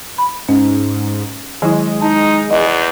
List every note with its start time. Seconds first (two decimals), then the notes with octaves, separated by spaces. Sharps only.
0.18 B5
0.49 G#2 C#4
1.62 D#3 F#3 G#3 E4
2.01 D#4 A5
2.51 E2 D#5